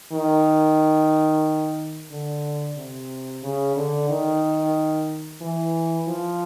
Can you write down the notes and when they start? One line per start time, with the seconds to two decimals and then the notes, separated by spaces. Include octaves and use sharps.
0.12 D#3
2.11 D3
2.77 C3
3.43 C#3
3.76 D3
4.10 D#3
5.41 E3
6.08 F3